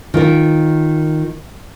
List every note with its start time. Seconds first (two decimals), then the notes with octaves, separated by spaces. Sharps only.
0.14 D#3 F4 A#4